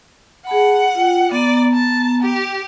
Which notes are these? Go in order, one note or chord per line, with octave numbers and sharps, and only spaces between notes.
G#4 F#5 A5 B5
F4 G5
B3 D5 A#5
A5
G4